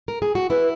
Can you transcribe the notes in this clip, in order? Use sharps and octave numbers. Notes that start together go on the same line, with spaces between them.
A#4
G#4
F#4
E4 B4